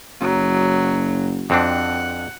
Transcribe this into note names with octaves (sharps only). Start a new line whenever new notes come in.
F#1 F#3
F2 C4 D4 F#5